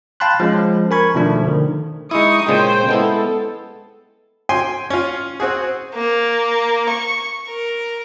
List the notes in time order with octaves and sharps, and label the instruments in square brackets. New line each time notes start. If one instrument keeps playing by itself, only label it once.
[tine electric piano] F5 G5 A5 B5 C6 F#6
F3 G#3 C#4
A#4 G#5 B5 C#6 G#6
B2 D#3 F3 A3 D4
D3 D#3
[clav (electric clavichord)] G#3 E4 [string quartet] D#4 C#6 D#6
[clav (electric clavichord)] A#2 C#3 G#3 [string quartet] C5 G5
[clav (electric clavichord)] G#3 B3 E4 [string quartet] A4
[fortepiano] G5 G#5 C6
C#4 F4
C4 F#4 G#4
[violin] A#3
C#6
A#4